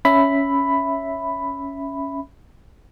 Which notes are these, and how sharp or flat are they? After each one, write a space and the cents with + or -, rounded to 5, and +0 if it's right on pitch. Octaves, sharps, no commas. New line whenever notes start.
C#4 +5 E5 +0 B5 +5